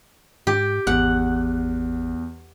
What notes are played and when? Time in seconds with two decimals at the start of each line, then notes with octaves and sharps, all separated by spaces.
0.47 G#2 G4
0.87 G#1 E2 F#5